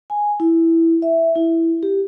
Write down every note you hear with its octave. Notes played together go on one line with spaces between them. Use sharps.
G#5
E4
E5
E4
G4